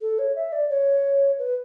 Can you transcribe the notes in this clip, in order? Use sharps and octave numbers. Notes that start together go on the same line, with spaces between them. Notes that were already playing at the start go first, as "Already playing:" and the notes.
A4
C#5
E5
D5
C#5
B4